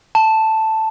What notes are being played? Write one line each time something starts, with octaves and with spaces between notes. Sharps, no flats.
A5